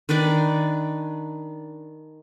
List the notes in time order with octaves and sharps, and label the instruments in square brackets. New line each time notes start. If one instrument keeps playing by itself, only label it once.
[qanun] D#3 D4 B4 D5